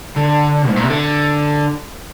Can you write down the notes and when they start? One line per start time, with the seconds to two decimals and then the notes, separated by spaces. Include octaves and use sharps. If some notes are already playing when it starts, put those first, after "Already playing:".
0.16 D3
0.69 G#2
0.76 A#2
0.83 C3
0.90 D3